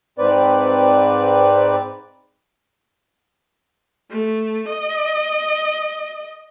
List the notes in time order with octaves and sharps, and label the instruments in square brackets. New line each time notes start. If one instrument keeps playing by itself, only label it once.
[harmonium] G#2 C4 B4 D5
[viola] A3
D#5